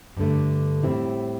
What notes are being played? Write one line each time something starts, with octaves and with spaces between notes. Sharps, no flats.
G2 D3 A3
A2 G3 C4 E4